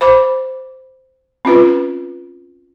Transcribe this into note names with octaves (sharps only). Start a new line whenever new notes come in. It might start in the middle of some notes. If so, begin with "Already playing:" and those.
C5 B5 D6
C4 C#4 F4 B4